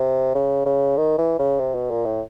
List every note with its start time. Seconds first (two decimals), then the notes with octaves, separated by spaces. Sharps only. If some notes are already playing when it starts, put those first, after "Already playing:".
Already playing: C3
0.35 C#3
0.66 C#3
0.97 D#3
1.18 E3
1.39 C#3
1.59 C3
1.75 B2
1.91 A#2
2.05 A2